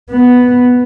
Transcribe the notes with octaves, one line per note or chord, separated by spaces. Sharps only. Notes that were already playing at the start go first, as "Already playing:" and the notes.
B3